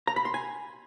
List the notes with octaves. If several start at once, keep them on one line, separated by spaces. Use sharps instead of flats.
A#5
B5
C6
G#5